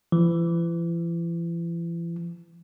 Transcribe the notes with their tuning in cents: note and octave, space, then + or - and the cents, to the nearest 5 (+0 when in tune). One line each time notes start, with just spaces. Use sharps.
E3 +40